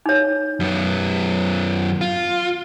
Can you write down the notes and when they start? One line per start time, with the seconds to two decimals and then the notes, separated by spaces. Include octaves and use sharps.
0.06 D#4 C#5
0.60 F#2 B3
2.01 F4